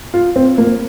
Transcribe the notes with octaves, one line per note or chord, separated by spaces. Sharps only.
F4
C4
A#3